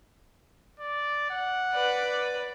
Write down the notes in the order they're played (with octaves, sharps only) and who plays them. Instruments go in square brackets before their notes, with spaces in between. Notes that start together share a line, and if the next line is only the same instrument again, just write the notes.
[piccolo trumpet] D5
F#5
[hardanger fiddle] B4 D5